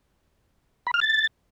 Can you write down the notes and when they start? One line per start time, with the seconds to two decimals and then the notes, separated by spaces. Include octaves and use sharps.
0.87 B5
0.94 F6
1.01 A6